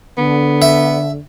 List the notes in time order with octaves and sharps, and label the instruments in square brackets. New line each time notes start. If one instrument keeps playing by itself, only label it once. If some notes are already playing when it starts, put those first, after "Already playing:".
[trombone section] D3 [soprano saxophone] B3
[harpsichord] E5